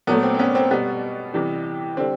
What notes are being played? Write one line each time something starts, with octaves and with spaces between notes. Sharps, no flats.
A#2 F#3 A3 B3
C4
C4
B3 C#4
C4
B2 G3 B3
C3 E3 G3
D3 G3 C4